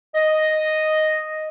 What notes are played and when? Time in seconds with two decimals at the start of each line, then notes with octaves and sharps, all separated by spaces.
0.15 D#5